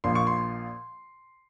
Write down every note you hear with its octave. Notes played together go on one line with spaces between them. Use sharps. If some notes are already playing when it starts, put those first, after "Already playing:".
A#1 A#2 F3 A#3 C6
C#6
C6